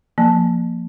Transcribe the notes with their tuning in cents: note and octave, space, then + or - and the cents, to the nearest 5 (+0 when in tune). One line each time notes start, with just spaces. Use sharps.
F3 +0 A#3 +0 A5 -10